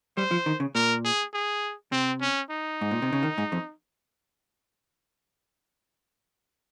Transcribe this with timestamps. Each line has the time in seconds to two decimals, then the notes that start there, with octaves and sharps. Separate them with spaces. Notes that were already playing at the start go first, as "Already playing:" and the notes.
0.17 G3 C5
0.31 F3
0.46 D#3
0.60 C#3
0.75 A#2 A#4
1.05 G#4
1.34 G#4
1.92 C3 C4
2.21 C#4
2.50 D#4
2.81 G#2
2.91 A#2
3.02 C3
3.13 C#3
3.23 D#3
3.38 G#2
3.52 F2